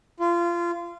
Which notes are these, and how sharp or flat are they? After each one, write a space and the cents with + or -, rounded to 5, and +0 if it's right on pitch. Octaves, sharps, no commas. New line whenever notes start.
F4 -25